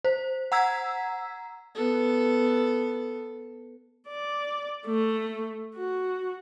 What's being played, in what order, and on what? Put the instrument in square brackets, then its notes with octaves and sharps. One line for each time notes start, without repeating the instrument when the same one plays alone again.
[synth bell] C5
F#5 A#5 E6 G#6 B6
[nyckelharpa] B3 A4
[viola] D5
A3
F#4